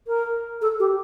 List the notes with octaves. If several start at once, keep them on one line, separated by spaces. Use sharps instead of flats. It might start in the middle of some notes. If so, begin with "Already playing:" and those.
A#4
A4
G4